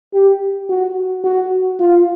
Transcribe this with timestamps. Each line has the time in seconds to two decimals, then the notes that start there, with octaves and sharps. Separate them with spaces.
0.13 G4
0.69 F#4
1.24 F#4
1.79 F4